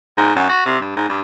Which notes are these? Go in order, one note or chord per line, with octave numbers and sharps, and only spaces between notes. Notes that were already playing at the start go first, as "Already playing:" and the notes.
G#2
F#2
F#4
C3
G2
G#2
G2